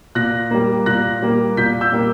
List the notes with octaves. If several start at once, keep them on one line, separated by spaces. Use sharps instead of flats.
A#2 F#6 A#6
G3 A#3
A#2 F#6 A#6
G3 A#3
A#2 G6 B6
E6 G6
G3 A#3